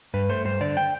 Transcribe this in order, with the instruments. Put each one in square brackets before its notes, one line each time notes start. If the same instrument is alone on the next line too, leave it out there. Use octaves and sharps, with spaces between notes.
[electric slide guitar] G2 B4
A3 C5
G2 C5
D3 D5
G5